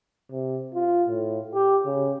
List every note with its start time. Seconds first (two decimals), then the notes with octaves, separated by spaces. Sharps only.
0.32 C3
0.74 F4
1.09 A2
1.54 G4
1.86 C#3